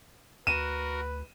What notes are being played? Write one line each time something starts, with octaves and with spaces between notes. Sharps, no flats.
D2 F#4 A#4 B4 D#7 E7